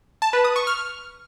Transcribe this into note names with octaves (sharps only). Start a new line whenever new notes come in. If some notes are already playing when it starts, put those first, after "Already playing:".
A5
B4
D#6
C#6
F6